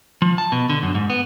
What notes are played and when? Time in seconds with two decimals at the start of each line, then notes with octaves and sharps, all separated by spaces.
0.22 F3
0.38 A5
0.52 B2
0.70 D3
0.83 F#2
0.95 G#2
1.10 B3